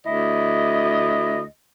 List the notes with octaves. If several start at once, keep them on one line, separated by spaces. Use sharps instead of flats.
D2 E4 D#5